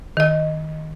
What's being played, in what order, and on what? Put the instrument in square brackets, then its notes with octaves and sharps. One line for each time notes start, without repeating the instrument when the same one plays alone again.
[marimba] D#3 D#5